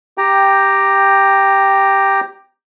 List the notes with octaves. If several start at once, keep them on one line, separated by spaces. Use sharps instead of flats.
G4 G5 A#5